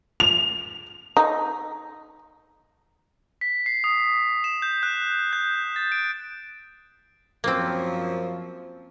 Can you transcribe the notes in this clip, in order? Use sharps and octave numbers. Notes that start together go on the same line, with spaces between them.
F7
D#4
B6
C7
D#6
E7
G6
F#6
G6
A6
D7
F#2 F3 A#3 C4